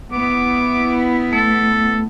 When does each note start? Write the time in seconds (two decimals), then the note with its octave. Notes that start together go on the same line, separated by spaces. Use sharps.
0.13 B3 E4 D6
1.33 A3 A4